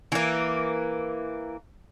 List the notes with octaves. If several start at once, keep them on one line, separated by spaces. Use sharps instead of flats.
E3 A#3